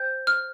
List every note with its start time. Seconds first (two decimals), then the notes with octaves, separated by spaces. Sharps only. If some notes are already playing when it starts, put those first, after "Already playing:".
Already playing: C5 G5 G6
0.27 F6